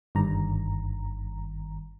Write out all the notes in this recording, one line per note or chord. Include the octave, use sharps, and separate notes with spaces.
G1 G2 D#3 A#5